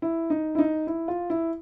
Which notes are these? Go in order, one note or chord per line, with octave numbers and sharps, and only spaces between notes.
E4
D#4
E4
D#4
E4
F4
E4